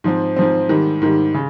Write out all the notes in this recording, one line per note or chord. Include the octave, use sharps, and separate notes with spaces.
G#2 F3 C4
G#2 F3 C4
G#2 D#3 G3
G#2 D#3 G3
C#3